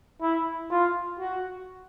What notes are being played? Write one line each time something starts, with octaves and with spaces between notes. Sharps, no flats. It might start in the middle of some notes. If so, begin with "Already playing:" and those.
E4
F4
F#4